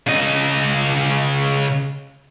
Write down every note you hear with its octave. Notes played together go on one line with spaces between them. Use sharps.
C#3 D#5